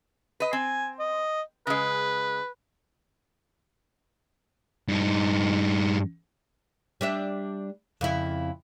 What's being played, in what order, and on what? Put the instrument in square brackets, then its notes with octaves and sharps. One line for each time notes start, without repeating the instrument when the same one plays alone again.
[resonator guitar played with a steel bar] B4 D#5
[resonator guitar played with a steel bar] C4 [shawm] G#5
[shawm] D#5
[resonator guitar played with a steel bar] C#3 G#3 [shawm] B4
[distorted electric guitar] G2 D#4
[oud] G3 D4 E5
F2 C#3 E4